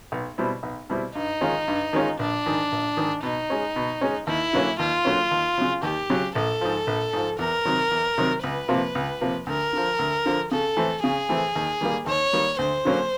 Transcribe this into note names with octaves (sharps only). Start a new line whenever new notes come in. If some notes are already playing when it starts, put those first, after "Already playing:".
B1
B2 G3 C4 E4
B1
B2 G3 C4 E4
G2 D#4
D#3 G#3 C#4 F4
G2
D#3 G#3 C#4 F4
A#1 D4
G#2 D#3
A#1
G#2 D#3
B2 D#4
G#3 C#4
B2
G#3 C#4
D#2 E4
D3 F#3 A#3 C#4
D#2 F4
D3 F#3 A#3 C#4
D#2
C#3 F#3
D#2 G4
C#3 F#3
A#1 A4
G#2 F3
A#1
G#2 F3
E2 A#4
C3 D#3 F#3
E2
C3 D#3 F#3
C#2 B4
C3 F3 A#3
C#2
C3 F3 A#3
D2 A#4
D3 F3
D2
D3 F3
C#3 A4
E3 A3 C4
C#3 G#4
E3 A3 C4
D#2
D#3 G3 A#3
D#2 C#5
D#3 G3 A#3
D2 C5
D3 F#3 A#3 C#4